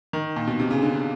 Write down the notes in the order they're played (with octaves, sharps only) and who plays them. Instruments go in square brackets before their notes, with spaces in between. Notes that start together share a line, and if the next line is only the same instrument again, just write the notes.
[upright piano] D#3
A#2
B2
C3
C#3
D3